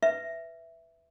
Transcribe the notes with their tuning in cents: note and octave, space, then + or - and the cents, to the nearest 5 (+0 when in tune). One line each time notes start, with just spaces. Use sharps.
B4 +10 E5 +0